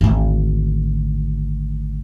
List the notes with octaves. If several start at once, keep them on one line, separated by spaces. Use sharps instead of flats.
G#1 D2